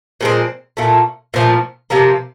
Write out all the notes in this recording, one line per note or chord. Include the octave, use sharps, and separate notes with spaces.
A#2 F3 G#3 C4
A#2 F3 A3
A#2 F3 A3
C3 F3 A#3